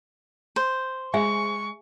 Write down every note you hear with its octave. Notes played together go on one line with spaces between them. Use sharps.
C5
G#3 E5 G#5 C#6